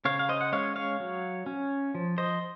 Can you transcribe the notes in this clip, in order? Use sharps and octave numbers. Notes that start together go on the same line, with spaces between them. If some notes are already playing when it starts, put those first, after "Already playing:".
C#3 C#5 F5
F5
C5 D#5
F#5
G#3 C#4 C#5 F5
C#5 F5
F#3
C#4
F3
C5 D#5